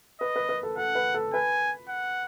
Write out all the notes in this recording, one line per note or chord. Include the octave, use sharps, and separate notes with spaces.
B4 D#5
B4
B4
A4
A4 F#5
B4
A4
B4 G#5
F#5